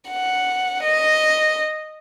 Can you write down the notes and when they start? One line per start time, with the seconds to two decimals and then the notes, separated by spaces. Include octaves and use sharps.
0.10 F#5
0.83 D#5